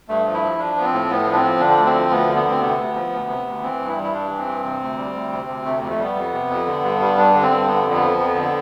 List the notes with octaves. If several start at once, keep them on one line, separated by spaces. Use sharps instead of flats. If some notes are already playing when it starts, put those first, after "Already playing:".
G2 A3
F3
E4
F3
F3 D4
F3 B3
C4
A2
A2 B3
F3 D4
C4
F3
D3 D4
D2
C4
F3
D2 B3
D3
B3
D2
C4
C3 B3
D2
F3
D2
C3
D2
E3 C4
G2
E4
G3
E4
G2 D4
E3
C4
G2
C3
D2
G3
D2
C3
D2
C3 A3
F2
A3
G3 B3
F2
C3
F2
D3
G2
G3
G2 D4
D3
C4
G2
D3 B3
F2
B3
F3
F2
D3